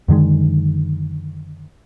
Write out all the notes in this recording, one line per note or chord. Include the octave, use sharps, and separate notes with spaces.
F#2 D3 D#3 G#3